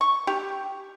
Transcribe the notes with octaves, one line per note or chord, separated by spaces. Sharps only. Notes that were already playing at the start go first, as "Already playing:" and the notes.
C#6
G4